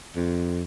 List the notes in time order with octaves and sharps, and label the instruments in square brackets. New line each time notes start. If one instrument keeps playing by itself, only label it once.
[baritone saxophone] F2